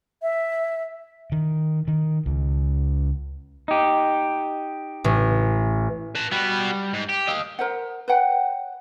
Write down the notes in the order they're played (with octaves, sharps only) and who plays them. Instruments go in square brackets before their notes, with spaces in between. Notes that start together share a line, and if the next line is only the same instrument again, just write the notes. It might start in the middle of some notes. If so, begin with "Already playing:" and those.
[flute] E5
[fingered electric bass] D#3
D#3
C#2
[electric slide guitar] D#4 G4
[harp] A1
[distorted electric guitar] B4 A5
[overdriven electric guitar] G3 [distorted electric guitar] B3 F#4
[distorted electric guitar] G#2
G4
[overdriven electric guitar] D#5 F5
[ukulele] A#4 C5 F#5
B4 C#5 F#5 G5